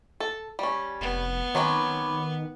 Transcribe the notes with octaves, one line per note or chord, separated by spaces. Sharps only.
A4
G3 C#4
F1 B3
D#3 F#3 C4 C#4 B5 D6